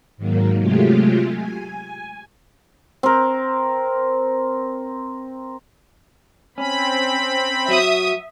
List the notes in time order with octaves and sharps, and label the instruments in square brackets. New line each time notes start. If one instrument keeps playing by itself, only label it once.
[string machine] G#2 D#3 F#3 A#3
C3 F#3 G#3 A3 F4 G4
G#5
[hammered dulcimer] C4 A#4
[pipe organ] C4 B5 [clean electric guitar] C#4
[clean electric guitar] F#3 [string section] E5 D#6